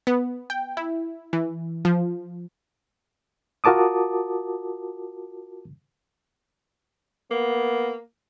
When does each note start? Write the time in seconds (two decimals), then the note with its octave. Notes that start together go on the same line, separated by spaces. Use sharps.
0.07 B3
0.50 G5
0.77 E4
1.33 E3
1.85 F3
3.64 F4 F#4 A#4 A5 D6 D#6
7.31 A#3 B3